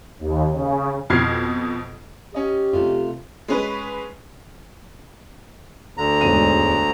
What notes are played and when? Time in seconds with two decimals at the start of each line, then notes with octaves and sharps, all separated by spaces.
0.20 D#2
0.52 C#3
1.10 F2 B2 F6 G#6 C7
2.34 C#4 G4 D#5
2.73 C3 A3 F4
3.48 G#3 C#4 B4
5.97 D2 D3 A#5
6.21 E1 G#2 D#7